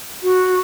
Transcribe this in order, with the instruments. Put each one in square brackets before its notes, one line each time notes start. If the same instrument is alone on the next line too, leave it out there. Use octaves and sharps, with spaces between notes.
[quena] F#4